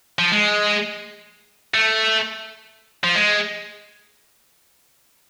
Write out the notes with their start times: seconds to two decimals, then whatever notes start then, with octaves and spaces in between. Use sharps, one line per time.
0.19 F3
0.32 G#3
1.74 A3
3.04 F3
3.16 G#3